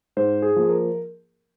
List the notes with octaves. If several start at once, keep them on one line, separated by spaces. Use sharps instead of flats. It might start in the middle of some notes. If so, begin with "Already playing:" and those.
G#2 C5
G#4
F3 A#3
A#4